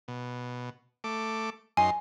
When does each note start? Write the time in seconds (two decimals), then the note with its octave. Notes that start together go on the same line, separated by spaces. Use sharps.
0.08 B2
1.04 A3 D6
1.77 F#2 D#4 G#5 C6